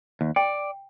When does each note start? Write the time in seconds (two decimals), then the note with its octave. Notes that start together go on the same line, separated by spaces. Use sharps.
0.21 D#2
0.36 D5 G5